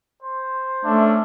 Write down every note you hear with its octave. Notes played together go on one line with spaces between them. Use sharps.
C5
A3 C#4 D4 E5